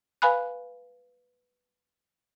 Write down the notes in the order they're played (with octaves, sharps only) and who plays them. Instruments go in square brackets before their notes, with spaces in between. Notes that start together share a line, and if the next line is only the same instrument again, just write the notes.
[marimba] B4 F5 G#5 B5 F#6